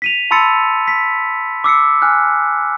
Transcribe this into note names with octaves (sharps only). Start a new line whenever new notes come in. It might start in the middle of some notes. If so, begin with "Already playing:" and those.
B6 D#7 F7
A5 B5 C6 E6 A6 C#7
B6
D6 E6 C7 C#7
G#5 F6 F#6